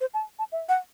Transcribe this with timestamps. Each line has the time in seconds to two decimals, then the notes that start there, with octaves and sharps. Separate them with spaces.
0.01 C5
0.14 A5
0.39 A5
0.52 E5
0.69 F#5